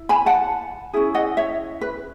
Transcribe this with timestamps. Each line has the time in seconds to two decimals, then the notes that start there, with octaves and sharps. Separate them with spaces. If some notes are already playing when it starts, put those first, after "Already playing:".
Already playing: E4
0.09 G#5 B5
0.26 F#5 A5
0.93 C#4 E4 G#4
1.14 D#5 F#5
1.37 C#5 E5
1.81 B4